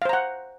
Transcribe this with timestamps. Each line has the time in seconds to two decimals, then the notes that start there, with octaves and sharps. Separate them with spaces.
0.02 F5
0.05 C5
0.09 A#5
0.13 F#5